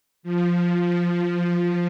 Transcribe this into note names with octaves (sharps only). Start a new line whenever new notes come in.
F3